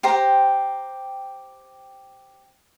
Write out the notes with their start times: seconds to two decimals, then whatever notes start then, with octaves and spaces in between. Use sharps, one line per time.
0.03 G4 C5 G5 A#5